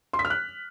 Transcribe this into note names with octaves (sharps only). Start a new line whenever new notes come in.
C6
B6
F6
F#6